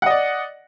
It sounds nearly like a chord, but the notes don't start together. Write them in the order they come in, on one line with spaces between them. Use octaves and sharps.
F#5 D#5 D5